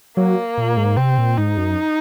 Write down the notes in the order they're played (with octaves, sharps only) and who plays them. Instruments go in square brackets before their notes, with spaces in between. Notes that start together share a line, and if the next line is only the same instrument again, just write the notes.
[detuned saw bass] F#3 [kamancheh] A#3
[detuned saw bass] A#2
G#2
[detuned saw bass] C3 [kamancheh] C4
[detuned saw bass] A#2
[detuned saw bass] G#2 [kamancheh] D#4
[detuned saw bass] F#2